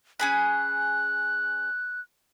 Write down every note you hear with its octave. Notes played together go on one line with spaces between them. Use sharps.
C#4 G#4 B5 F#6